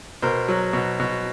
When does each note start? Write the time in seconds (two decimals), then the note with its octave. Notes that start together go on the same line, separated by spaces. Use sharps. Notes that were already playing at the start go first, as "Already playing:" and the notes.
0.22 B2 A#4 C5
0.48 F#3
0.73 B2
0.99 B2